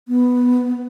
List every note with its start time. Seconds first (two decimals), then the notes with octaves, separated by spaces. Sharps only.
0.08 B3